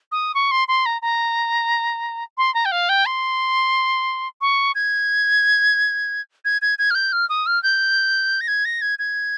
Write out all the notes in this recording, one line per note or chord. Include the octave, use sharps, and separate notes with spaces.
D#6
C#6
C6
C6
A#5
A#5
C6
A#5
G5
F5
G5
C6
C#6
G#6
G#6
G#6
G#6
F6
G6
F6
D#6
F6
G6
A#6
G#6
A#6
G#6
G#6